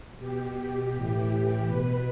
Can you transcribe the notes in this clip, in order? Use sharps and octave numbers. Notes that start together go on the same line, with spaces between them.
B2 G4
A2 E3
B2 B4